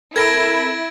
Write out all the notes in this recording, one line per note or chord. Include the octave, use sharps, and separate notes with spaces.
C4 E4 A4 A#4 G#6 A#6 D7